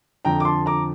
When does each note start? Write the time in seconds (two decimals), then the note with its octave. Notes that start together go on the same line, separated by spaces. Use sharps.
0.25 F2 D3 F3 G5 A#5
0.40 D6
0.45 A5 C6
0.66 A#5 D6